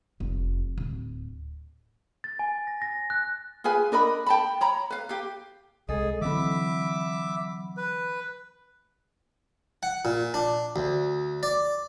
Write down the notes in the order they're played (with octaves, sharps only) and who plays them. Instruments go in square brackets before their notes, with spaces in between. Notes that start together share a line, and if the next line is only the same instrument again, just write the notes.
[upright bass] F1
D1
[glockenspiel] A6
G#5
A#6
A#6
F#6
[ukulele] F4 G#4 B4 G#5
D4 A#4 D#5 B5
G5 A5 B5
C#5 A#5 B5
B4 F5
G4 F5
[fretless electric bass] C2 [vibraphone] G#3 A4 D#5 [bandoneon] G#4
[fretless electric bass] D3 E3 C4 [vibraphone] F#3 B5 [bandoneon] E5 D6
[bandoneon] B4
[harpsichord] F#5
A#2
D4
D2
D5